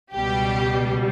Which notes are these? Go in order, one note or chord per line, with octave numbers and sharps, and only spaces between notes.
C#2 B2 G3 G4